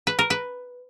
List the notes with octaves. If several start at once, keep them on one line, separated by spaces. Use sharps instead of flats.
B4
A#4
B4